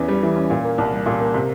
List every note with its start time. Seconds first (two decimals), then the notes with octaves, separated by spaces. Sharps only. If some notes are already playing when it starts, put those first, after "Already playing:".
Already playing: E2 E3 C#4
0.08 G3
0.22 E3
0.36 C#4
0.50 A#2
0.64 A#3
0.78 C2
0.92 G3
1.06 A#2
1.20 A#3
1.34 C3